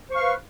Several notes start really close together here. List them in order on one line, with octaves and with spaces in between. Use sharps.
C5 C#6 F5 B4